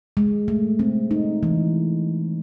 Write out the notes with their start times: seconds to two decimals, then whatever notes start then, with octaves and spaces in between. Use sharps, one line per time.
0.17 G#3
0.48 A3
0.79 C4
1.11 D#4
1.43 E3